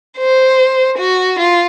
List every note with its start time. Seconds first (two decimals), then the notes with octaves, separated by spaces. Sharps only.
0.18 C5
0.98 F#4
1.38 F4